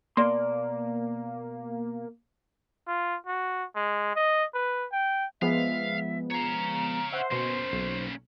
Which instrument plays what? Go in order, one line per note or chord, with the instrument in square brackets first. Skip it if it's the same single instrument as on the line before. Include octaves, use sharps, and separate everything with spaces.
[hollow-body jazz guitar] B2 D5 C6 [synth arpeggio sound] A#3
[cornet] F4
F#4
G#3
D#5
B4
G5
[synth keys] F3 G#3 B3 [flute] E5 [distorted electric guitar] F5
[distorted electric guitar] C#5 F5 [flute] A#5
[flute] C5 [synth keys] E5 F#5 C6
[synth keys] B2 C6 [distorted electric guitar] A#3 C#4
[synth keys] B1